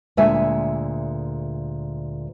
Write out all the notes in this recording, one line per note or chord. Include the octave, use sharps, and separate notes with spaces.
D2 A#2 G#3 E5 G#5